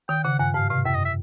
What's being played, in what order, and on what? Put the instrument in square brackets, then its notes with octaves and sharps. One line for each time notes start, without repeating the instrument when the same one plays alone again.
[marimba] D#3 [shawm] G5
[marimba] C#3 [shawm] F#5
[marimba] G2 [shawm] F#5
[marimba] G#2 [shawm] F5
[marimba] C3 [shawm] F5
[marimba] F#2 [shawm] E5
[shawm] D#5
E5